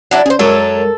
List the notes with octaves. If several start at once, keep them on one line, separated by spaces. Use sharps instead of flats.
F#3 D4 E4
C#4 G#4 C5
F#2 F#3 G#3 A4 A#4